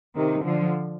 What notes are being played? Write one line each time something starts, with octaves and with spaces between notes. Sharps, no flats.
C3 D#3
D3 F3